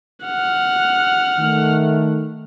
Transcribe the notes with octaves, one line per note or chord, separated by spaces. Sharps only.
F#5 F6
D#3 A3